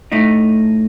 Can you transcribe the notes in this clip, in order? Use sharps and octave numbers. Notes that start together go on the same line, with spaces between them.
A2 A3 D#4